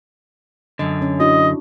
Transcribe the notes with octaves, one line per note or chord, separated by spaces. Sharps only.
F#2 D3 D#5
C#4
D4 E4 F#4 D#5